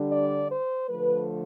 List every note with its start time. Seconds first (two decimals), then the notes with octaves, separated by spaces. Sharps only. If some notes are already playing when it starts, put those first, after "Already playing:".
Already playing: D3 G3 D4
0.10 D5
0.49 C5
0.88 D3 F3 A3 B4